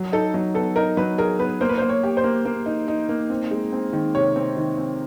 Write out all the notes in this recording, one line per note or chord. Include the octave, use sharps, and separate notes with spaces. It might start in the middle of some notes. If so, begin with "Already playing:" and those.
Already playing: F#3
D#4 A4
F#3
B3 A4
D#4 A#4
F#3 B4
G#4 A#4
B3 B4
A#3 C5
B4
A#3 C5
C#5
G4
C5
A#3
A#3
D#4
D#4
A#3
C4
G#3
C4
D#3
C3 C#5
C4
D#3
C4